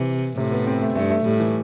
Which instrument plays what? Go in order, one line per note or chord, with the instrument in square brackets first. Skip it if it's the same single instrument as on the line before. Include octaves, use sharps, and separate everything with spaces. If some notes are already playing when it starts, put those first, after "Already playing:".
Already playing: [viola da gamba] C3 [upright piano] E3
[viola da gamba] A2 [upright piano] C3
[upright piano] B3
C4
A3
[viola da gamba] G2 [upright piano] A3
[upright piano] A3
[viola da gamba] A2 [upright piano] G3
[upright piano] E3